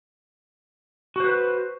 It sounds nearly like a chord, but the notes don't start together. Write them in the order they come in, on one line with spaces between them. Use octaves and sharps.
F#4 C5 B4